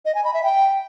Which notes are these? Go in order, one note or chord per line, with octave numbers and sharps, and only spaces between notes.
D#5
G#5
B5
E5
G5